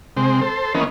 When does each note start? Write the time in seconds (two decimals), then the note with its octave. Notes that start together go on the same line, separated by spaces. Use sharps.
0.17 C3 G#3 C4
0.41 A4 C5
0.74 E3 A#3 B3 C#4 D#5